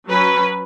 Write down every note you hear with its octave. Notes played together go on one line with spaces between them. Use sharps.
F#3 C#4 B4